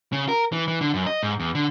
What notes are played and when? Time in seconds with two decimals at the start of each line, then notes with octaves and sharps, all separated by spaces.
0.13 C#3
0.29 A#4
0.52 E3
0.68 E3
0.81 D3
0.94 F#2
1.07 D#5
1.23 G#2
1.40 E2
1.55 D3